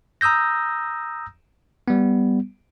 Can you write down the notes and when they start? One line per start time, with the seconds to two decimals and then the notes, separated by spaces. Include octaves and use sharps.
0.21 A#5 D#6 E6 G6 A#6
1.88 G3 B3